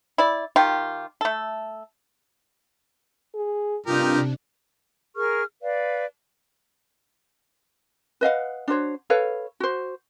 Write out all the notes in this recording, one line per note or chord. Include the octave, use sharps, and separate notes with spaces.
E4 D5
D#3 F4 G4
A3 A4
G#4
G2 C3 D4 D#4 F4 G4 A#4
G#4 A#4 C#6 F6
B4 D5 F5
B4 D#5 F5 F#5
D4 F#4 C5 C#5
A4 B4 C#5 F5
F#4 C5